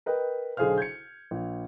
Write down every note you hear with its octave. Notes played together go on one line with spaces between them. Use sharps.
A#4 B4 D#5 G5
B1 D3 G#4 C5 F5 F6
G6 G#6 C#7
A#1